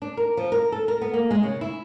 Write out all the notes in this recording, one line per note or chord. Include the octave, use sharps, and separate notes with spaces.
D4
A#4
F3
A#4
A4
A#4
B3
A#3
G#3
C#3
E4